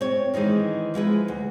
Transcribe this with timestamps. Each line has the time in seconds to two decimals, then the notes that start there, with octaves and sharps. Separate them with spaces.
0.01 C4 C#5
0.34 D#3 E3 G#3 D#4
0.94 F3 G#3 E4 B4
1.28 D2